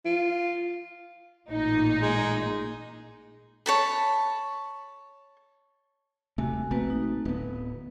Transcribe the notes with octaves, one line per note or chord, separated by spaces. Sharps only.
F4
A1 A#2 D#4
G#3
C#5 A5 B5
D#1 C3 A3 F#4 G#5
A#1 A3 A#3 C4 F#4 B4
D#4
D1 B3 B4